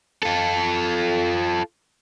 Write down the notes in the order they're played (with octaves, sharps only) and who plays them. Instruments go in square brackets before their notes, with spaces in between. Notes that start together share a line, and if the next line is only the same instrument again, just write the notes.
[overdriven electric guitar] F4 A4